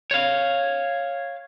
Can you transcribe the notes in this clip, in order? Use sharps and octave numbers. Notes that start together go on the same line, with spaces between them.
C#5 F5